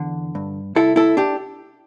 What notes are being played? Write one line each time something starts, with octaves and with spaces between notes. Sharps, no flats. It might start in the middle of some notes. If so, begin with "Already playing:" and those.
Already playing: E2 D3
G2
C2 E4 A4
E4 A4
D4 G4